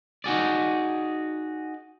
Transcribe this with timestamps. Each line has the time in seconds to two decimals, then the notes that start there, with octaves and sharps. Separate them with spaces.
0.24 D#4 F#4 G#4 D5